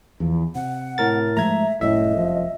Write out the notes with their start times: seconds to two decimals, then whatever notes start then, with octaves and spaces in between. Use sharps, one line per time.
0.20 E2 F3
0.55 C3 F#5
0.98 A2 A#4 A6
1.37 G#2 F3 A3 E5 A#5 G#6
1.81 F1 C2 F#2 A2 D#5 E5
2.16 F3